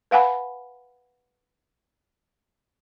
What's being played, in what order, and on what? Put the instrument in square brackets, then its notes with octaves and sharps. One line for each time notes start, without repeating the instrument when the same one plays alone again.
[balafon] B4 F5 F#5 G#5 B5